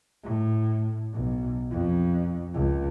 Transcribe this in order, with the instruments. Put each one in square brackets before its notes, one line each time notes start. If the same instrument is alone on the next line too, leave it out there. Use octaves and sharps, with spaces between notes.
[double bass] A2
B1
F2
C#2